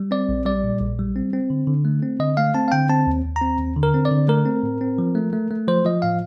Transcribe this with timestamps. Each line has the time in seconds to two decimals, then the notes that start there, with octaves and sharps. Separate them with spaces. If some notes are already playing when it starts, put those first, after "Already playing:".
Already playing: G3
0.11 C4 D5
0.29 A#1
0.45 G3 D5
0.64 A#2
0.80 A#1
0.99 G3
1.16 C4
1.33 C4
1.50 D3
1.67 D3
1.85 A3
2.02 C4
2.19 D3 D#5
2.37 A3 F5
2.54 C4 A5
2.68 F5
2.72 D3 G5
2.89 C4 A5
3.07 D#2
3.25 D#2
3.36 A#5
3.41 C4
3.59 D#2
3.76 D3
3.83 A#4
3.94 C4
4.05 D5
4.11 D3
4.29 A3 A#4
4.46 C4
4.63 A2
4.81 C4
4.98 F3
5.15 A3
5.33 A3
5.51 A3
5.68 F3 C5
5.85 F3 D#5
6.02 A2 F5